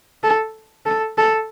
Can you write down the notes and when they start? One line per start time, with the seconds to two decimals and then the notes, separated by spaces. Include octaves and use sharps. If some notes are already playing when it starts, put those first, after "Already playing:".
0.23 A4
0.86 A4
1.18 A4